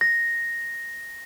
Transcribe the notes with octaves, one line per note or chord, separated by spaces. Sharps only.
A#6